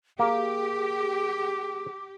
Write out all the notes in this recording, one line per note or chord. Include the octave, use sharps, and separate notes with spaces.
A#3 G4 G#4 D6